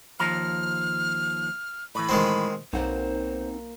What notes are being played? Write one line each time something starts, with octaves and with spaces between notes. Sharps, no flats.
D#2 F3 A#5 F6
A2 E3 B5
D#3 G#3 C4
B1 A#3 C4 D#4 C5 F#5